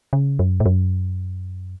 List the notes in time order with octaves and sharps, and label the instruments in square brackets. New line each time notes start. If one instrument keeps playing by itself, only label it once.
[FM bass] C#3
F#2
A2
F#2